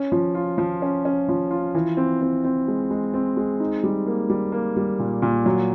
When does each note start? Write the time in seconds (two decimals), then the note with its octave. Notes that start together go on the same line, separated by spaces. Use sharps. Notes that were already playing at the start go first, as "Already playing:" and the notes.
Already playing: C#4
0.12 F3
0.35 F4
0.58 F3
0.82 C#4
1.05 C#4
1.29 F3
1.51 F4
1.75 E3
1.97 C4
2.22 C4
2.44 C4
2.68 G#3
2.91 G#3
3.14 C4
3.37 G#3
3.60 D#4
3.84 G3
4.07 A#3
4.30 G3
4.52 A#3
4.77 G3
4.99 A#2
5.22 A#2
5.46 F#3